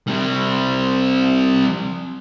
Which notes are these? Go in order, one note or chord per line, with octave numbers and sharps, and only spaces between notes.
G3 C4